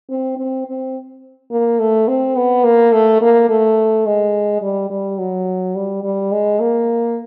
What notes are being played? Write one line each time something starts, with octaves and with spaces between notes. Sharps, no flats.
C4
C4
C4
A#3
A3
C4
B3
A#3
A3
A#3
A3
G#3
G3
G3
F#3
G3
G3
G#3
A#3